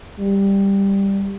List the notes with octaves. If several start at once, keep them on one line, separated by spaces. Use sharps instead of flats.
G3